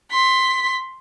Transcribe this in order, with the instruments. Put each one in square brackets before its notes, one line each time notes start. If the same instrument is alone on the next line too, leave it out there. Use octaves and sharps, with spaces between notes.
[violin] C6 B6